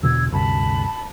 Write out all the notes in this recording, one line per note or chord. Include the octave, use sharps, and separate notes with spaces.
E2 B2 D3 E6 G#6
D2 G2 C3 A5 B5